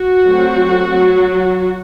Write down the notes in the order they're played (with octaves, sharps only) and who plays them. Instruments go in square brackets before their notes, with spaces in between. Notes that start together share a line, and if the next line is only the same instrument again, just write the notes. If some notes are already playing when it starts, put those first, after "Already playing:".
Already playing: [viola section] F#4
F#3 A3 C4
F#3